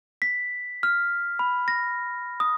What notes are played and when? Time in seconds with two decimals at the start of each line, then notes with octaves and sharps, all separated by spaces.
0.22 B6
0.83 F6
1.39 B5
1.68 A#6
2.40 D#6